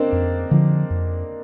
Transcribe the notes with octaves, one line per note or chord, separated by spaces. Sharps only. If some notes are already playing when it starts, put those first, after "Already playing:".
Already playing: A#3 C4 D4 D#4
F2
D3 F3
F2